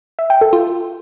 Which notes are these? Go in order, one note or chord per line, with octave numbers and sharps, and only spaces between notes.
E5
G5
A4
F4